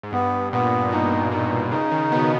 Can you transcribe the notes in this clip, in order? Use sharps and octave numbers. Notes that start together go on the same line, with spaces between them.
G#2
G2 B3
A#2 B3
B2 D#4
B2 D#4
C#3 D#4
D#3
B2 B3